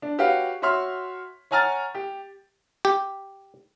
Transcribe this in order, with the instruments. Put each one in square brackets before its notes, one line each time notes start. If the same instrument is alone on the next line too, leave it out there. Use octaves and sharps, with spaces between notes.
[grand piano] D4
F#4 G4 B4 C#5 F5 F#5
F#4 C#5 E5 C6 F6
C#5 F#5 G#5 A#5 F6 A6
G4
[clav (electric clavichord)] G4